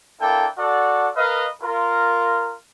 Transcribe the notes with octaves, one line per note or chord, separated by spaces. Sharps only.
A#3 D4 E4 A4 G5
F#4 A4 D5 F#5
A#4 B4 D#5 F5
F4 A#4